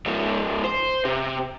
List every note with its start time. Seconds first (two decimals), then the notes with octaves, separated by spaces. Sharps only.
0.06 G#2 F3
0.64 C5
1.05 C3